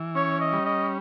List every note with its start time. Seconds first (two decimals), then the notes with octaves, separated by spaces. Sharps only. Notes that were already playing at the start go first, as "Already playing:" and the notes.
Already playing: E3
0.15 C#4 C#5
0.41 D#5
0.53 G3
0.65 D#5